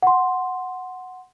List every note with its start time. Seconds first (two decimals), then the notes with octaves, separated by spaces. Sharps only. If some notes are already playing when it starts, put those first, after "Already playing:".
0.03 F#5 C6